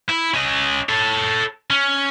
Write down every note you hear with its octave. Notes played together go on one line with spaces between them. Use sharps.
E4
C#4 D#5
A4 C#5
C#4